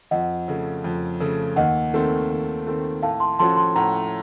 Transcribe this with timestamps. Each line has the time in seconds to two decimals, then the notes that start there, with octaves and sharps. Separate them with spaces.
0.11 F2 D#5 F#5
0.48 C#3 A3
0.84 F2
1.21 C#3 A3
1.56 D#2 D#5 F#5
1.93 D#3 A3 C4
2.30 D#2
2.66 D#3 A3 C4
3.03 A2 F5 A5
3.20 A5 C6
3.39 F3 A3 C#4 F#4 A5 C6
3.56 A5 C6
3.75 A2 F#5 A#5